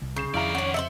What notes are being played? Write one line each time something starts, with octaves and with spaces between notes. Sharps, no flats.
C2
C#3 G6 C7 E7
F2 D#3 E4 D5 F5 A#5
C#4 C#5 F#5
C3 C5 D#5 E5 C#7 F#7